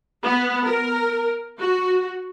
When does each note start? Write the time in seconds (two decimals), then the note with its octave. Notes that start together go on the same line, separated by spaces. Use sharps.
0.24 B3
0.65 A#4
1.58 F#4